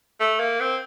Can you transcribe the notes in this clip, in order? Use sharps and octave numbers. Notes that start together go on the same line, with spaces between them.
A3
A#3
C4